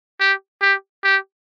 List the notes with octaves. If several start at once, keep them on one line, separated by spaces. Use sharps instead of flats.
G4
G4
G4